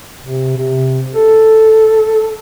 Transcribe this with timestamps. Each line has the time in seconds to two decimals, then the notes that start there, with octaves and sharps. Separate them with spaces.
0.23 C3
0.57 C3
1.15 A4